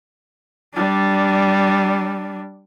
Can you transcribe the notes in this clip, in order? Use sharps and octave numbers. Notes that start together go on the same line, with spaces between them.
G3 D4